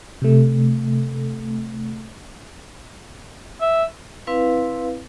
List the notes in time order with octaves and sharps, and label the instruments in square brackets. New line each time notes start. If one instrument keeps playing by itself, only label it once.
[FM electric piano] C3 A3
[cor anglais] E5
[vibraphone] C4 E4 B4 F5